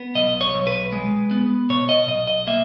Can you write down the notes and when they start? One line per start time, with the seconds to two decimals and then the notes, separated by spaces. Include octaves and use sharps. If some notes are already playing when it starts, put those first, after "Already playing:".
Already playing: B3
0.15 B1 D#5
0.41 C#5
0.54 B1
0.67 B4
0.92 G#3
1.31 B3
1.69 B2 C#5
1.89 D#5
2.08 B1 D#5
2.27 D#5
2.47 A#3 E5